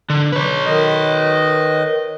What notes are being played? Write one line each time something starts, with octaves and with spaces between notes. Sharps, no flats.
D3
B4 C#5
D#3 D#5